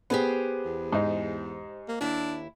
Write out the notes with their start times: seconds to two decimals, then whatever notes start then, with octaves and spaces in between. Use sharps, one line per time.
0.10 B3 G4 G#4 C5
0.66 E2
0.93 G#2 D#4
1.89 A#3
2.01 D#2 D4 E4